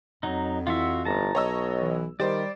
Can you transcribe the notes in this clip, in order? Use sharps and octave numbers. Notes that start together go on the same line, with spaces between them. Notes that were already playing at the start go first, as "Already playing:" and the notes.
F2 F#3 D#4
E3 F4 F#4 E5
G1 A5 A#5
B1 C#5 D#5 E6
E3
D#3 G3 G4 C5 D5